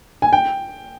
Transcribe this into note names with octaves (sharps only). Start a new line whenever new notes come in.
G#5
G5